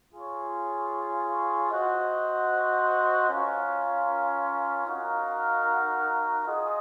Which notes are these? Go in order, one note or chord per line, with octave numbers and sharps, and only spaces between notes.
F4 G#4 C#5
F#4 C5 D#5 F#5
C#4 F4 A#4 F5
D#4 F#4 A#4 F5
F4 G#4 D#5